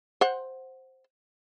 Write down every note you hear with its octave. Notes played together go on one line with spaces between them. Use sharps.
C5 F#5